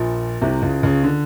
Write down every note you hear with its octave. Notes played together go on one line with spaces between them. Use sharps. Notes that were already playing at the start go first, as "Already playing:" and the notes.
Already playing: A#1 A#2
C2 C3
C#2 C#3
C#2 C#3
D3